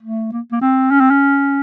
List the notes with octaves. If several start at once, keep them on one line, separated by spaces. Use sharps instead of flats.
A3
A#3
A#3
C4
C#4
C4
C#4